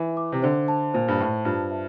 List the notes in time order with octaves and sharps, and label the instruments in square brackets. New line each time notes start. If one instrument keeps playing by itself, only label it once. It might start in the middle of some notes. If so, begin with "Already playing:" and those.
Already playing: [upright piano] E3 [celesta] E5
[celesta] D6
[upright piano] C3
[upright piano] D3 [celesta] C5
[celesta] A5
[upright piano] A#2 [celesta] C5
[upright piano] G2
[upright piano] A2 [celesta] A5
[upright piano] G2 [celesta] F4
[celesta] E5